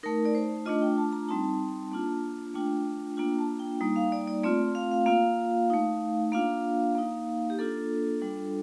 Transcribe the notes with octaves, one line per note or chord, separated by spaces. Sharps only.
A3 D#4 A#4
D5
C5
A3 D4 F4 D#5
G5
A5
A#5
G3 C4 D#4 A5
A#3 D4 F4
A3 D4 F4 G5
A#3 D4 F4 G5
A5
G5
G3 A#3 D#4
F5
D5
D5
A3 C4 F4 D5
F5
F5
A#3 F4 F5
A3 D#4
A#3 D4 F4 F5
A#3 D#4
G4
A#3 D4 F4 A4
G3 D4 F4